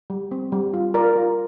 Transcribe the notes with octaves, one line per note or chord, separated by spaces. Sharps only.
G3
C4
G3
F4
F4 A#4 D5
F4